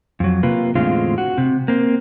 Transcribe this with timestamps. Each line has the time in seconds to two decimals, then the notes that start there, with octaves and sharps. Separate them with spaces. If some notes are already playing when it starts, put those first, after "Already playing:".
0.20 F2 F#3
0.43 C3 A#3 F4 B4
0.75 E2 A2 D3 G#3 C4 F4
1.18 F#4
1.38 C3
1.68 A#3 C4